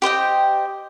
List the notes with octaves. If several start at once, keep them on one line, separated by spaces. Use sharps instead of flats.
G4 C5 D#5 G5